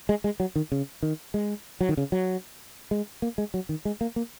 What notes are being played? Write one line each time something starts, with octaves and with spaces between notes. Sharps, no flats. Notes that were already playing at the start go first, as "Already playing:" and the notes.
G#3
G#3
F#3
D#3
C#3
D#3
G#3
F#3
D#3
C#3
F#3
G#3
A#3
G#3
F#3
D#3
G#3
A#3
A#3